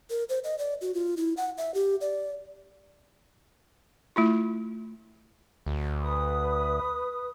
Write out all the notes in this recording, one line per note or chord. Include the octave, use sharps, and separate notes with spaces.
A#4
C5
D#5
D5
F#4
F4
E4
F#5
E5
G4
D5
A3 E4 F4
D2
B4 D#6